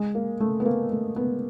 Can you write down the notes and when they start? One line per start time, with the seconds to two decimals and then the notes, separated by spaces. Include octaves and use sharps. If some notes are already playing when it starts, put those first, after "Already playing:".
Already playing: G#3
0.15 A#3
0.40 A3
0.60 B3
0.65 A#3
0.92 A3
1.16 B3